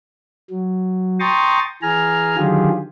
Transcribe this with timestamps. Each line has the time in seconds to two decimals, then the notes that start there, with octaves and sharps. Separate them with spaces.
0.50 F#3
1.20 G5 A#5 C6 C#6 D#6 A6
1.82 E3 G#4 G#5 A#5 F6
2.37 D3 D#3 F#3 F4 G4 G#4